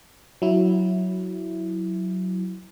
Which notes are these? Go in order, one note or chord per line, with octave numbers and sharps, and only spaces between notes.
F#3 E4